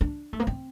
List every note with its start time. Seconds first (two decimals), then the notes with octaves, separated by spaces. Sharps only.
0.01 D4
0.33 A3
0.40 A#3
0.47 C4